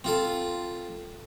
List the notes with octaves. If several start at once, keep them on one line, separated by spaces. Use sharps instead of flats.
C4 F4 A4